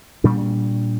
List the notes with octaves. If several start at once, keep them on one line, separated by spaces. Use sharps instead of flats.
A#2 G3 D4